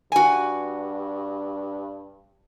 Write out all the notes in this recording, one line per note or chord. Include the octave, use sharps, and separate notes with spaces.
G2 F#4 G#5